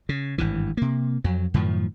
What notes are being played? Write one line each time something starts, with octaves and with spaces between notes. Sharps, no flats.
C#3
G#1 G2 E3
C3 A#3
F2 F#3
F#2 A2 D#3 F3